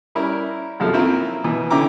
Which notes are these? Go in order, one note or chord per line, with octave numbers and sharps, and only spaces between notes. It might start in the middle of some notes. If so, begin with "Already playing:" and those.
G3 C#4 E4 A#4
F#2 C3 F3 G#3 A4 F6
A#3 C4 C#4 E4 F4 A#4
B2 E3 B3
D3 C#4 E4 G5 A#5 D6